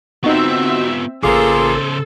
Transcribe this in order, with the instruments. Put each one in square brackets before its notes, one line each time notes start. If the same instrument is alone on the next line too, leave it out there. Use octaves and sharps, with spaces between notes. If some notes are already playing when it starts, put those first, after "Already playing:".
[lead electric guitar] B3 F4 [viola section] C4 E5 [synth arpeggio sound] D#4 F#4
[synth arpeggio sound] A1 D6 [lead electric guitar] C#3 C5 [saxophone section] A#3 F4 G#4 [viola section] A4